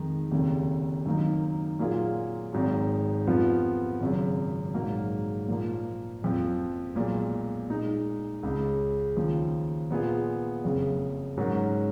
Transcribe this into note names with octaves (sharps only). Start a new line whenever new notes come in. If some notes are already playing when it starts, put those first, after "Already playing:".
Already playing: F2 D#3 G#3
F1 D#2 C#3
F#2 D#3 A#3 D#4
A#2 F#3 A#3 F4 G#4
G#1 G#2 F#3
F1 F2 F3 B3 F4
G#1 F#2 C#3
A#1 G#2 F#3 A#3
A#2 F3 A#3
F#1 F2 F3
B1 A#2 G#3
A#2 G#3 D#4
C#2 C#3 G#3
D#2 C#3 F3
A#2 F3 B3 F4 G#4
F#1 F2 C#3
G#2 F#3 C#4 F#4 A#4